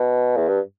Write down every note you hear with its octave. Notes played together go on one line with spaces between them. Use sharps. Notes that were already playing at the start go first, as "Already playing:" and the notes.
Already playing: B2
E2
G2